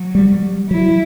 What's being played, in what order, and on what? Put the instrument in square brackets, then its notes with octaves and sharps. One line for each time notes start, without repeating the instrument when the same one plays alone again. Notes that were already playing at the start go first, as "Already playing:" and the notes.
Already playing: [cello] F#3
[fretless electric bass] G3
[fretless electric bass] F#3 [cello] E4